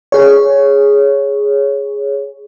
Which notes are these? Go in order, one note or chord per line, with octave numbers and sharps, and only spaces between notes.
G#4 C#5